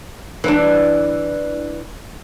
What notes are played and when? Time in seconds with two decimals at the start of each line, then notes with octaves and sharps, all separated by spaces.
0.44 E3 D4